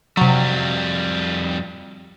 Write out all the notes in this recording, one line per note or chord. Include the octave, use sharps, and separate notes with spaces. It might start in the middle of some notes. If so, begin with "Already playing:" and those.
F2 C3 F#3 G3